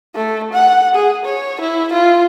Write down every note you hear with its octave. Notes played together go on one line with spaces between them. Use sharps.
A3
F#5
G#4
C#5
E4
F4